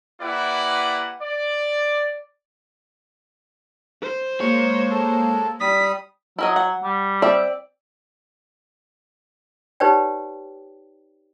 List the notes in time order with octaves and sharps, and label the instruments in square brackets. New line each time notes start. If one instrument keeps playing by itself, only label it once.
[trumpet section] A#3 E4 G4 B4 D5 F#5
D5
[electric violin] C5
[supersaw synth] G#3 A#3 [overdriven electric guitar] C#5
[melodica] A4
[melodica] G3 D#6 [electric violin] B6
[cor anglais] F#3 [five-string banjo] E4 A#4 D#5
[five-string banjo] F#5
[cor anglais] G3
[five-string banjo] C4 E5 [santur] D5
[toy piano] D#4 G4 B4 C#5 D5 G5